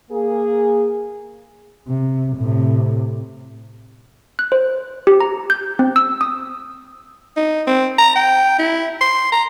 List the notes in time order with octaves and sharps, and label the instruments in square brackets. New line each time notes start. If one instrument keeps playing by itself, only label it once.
[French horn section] A#3 G#4
[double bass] C3
A2 C3
[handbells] F#6
C5
G4
A#5
G6
C4
E6
D#6
[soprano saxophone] D#4
C4
A#5
G5
E4
C6
A#5